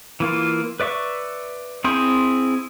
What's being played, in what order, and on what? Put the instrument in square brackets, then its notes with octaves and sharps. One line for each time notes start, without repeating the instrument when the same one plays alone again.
[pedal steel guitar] E3 A#3 F4
B4 D5 E5 C#6
C4 E4 G#4 C6 G6